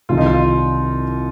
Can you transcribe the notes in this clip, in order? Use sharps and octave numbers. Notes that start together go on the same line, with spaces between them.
C2 C3 D#3 F4
D#4
F4